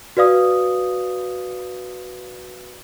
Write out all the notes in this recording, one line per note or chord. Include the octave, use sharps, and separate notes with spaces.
F#4 B4 D5 F5 D#6